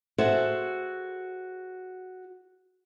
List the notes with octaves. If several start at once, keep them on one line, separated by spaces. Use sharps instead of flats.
F#4 G#4 A4 C5 E5